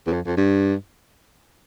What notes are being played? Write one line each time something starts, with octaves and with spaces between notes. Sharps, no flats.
E2
F2
F2
G2